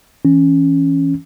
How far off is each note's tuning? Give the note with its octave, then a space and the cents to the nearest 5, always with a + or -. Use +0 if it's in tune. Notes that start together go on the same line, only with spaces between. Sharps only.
E3 -20 C#4 -5